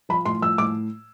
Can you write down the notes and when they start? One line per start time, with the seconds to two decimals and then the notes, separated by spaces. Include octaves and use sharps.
0.09 F3 B5
0.26 A2 C6
0.41 F3 E6
0.58 A2 D6